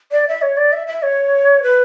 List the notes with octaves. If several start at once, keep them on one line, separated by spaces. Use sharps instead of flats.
D5
E5
C#5
D5
E5
E5
C#5
B4